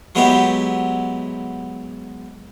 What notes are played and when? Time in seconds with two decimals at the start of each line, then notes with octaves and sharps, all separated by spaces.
0.15 F#3 G#3 B3 E4 G4